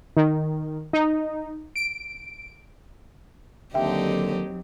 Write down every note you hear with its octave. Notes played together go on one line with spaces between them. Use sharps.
D#3
D#4
D7
D#2 D3 F#3 C4 D#4 G4 E5 G5